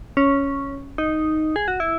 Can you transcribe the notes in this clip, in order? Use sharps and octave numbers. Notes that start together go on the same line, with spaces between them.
C#4
D#4
G#4
F#4
E4